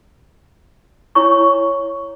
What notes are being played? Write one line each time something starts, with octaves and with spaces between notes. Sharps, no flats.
E4 C#5 G#5 A#5 C#6